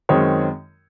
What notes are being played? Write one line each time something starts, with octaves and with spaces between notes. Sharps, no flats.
F#2 D#3 G#3 C4 C#5